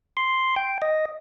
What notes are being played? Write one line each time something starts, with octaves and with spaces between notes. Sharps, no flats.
C6
G5
D#5